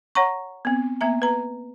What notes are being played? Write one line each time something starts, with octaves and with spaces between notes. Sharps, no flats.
C#5 F#5 A#5 C#6
B3 C4
A#3 B3 E5 A#5
B4 A#5